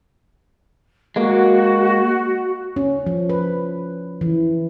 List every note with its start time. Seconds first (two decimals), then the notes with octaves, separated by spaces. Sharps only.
1.16 G#3 A#3 F#4
2.76 C#4
3.06 F3
3.30 B4
4.21 E3